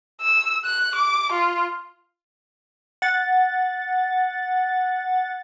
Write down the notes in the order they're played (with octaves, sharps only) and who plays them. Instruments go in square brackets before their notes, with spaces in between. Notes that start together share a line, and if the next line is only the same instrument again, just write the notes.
[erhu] E6
F#6
D6
F4
[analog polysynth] F#5 A6